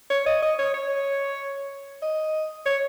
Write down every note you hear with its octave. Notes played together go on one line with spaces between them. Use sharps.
C#5
D#5
D#5
C#5
C#5
D#5
C#5